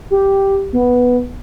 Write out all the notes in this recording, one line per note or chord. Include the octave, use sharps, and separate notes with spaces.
G4
B3